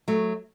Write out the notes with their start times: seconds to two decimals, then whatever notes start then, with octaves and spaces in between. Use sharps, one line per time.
0.08 F#3 A3